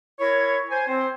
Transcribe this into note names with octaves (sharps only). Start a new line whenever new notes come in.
E4 A#4 C#5
C5 G#5
C4 C5